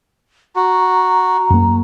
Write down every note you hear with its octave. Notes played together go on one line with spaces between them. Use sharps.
F#4 A#5
F#2 A#3